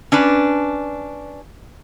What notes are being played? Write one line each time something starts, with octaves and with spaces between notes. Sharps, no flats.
C#4 D4 B4